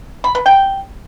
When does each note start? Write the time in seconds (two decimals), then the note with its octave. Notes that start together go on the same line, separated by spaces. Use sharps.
0.24 B5
0.35 B4
0.46 G5